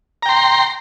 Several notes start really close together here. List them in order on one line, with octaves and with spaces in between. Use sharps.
A#5 G5 C6